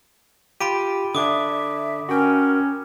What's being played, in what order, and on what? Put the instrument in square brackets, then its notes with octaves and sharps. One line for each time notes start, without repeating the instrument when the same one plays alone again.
[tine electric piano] F4 G4 [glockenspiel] B5 D7 D#7
[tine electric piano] D3 D4 [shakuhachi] E5 [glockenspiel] D6 D#6
[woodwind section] C#4 [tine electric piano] F#4 G5 [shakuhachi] A#4